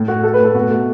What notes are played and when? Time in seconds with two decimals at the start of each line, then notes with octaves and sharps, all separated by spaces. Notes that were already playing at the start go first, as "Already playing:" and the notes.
Already playing: A2
0.08 A3 F#4
0.23 A3 A4
0.34 B4
0.40 A2 A4
0.54 B2 F#4
0.71 A3